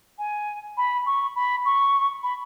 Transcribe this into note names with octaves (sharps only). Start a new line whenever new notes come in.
G#5
B5
C#6
B5
C#6
B5